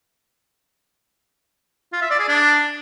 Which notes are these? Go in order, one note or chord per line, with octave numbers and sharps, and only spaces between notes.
F4
E5
D5
G#4
D4